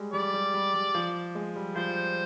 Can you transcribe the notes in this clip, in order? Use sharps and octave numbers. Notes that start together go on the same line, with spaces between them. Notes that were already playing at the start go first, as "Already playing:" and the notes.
Already playing: G3 G#3
G3 D5
G3
G3
G3
F3
G#3
G3
F3 C5